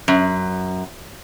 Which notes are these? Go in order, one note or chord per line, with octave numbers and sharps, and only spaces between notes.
F#2